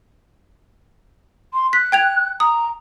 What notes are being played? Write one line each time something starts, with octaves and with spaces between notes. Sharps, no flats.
C6
F#6 B6
G5 G#6 F7
A#5 D#6